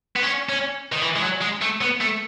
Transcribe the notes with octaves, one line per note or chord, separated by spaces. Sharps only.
B3
C#4
C#4
D#3
E3
G#3
F#3
G#3
A3
B3
A3